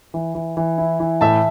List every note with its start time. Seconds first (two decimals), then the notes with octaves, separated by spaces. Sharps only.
0.14 E3
0.35 E3
0.57 E3
0.78 E4
1.00 E3
1.21 A2 E5 A5